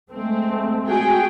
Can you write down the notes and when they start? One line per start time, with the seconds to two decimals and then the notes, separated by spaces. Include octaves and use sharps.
0.12 G#3 A3 C4
0.88 F#4 G#4 G5